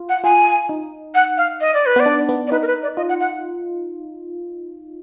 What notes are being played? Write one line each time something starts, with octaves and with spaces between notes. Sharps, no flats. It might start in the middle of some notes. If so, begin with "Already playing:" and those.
Already playing: F4
F#5
F4 G#5
D#4
F#5
F5
D#5
D5
B4
B3 D5
D4
B3
D5
D#4 B4
A#4
B4
D5
F4 D#5
F#5
F#5